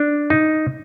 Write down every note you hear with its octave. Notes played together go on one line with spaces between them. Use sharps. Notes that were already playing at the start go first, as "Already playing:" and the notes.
Already playing: D4
D#4